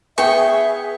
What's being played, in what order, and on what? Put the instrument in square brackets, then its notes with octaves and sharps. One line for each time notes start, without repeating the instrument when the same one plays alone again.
[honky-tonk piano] B3 G#4 [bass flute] E5 [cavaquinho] G5 C#6